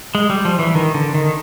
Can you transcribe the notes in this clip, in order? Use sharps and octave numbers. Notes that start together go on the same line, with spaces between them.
G#3
G3
F3
E3
D#3
D3
D#3